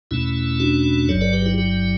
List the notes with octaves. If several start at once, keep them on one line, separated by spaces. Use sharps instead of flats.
E2 B2 A3 C#4 E4
D4 F#4
G1 G2 F#3 A4 C#5
B4 D5
G4 B4
E4 G4
E4 G4